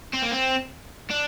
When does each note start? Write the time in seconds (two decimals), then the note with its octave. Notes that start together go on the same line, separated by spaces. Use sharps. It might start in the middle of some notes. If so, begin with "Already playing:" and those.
0.14 C4
0.23 A#3
0.32 C4
1.11 D4